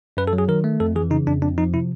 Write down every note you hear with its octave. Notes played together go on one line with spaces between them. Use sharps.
F#2 B4
A4
F#3
G#4
D#3 A#4
A3
F2 A4
E3 G#4
C#3 D#4
F2 D4
F2 D4
F3 D#4
C3 E4